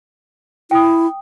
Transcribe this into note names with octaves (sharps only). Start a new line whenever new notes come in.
E4 G5 D#6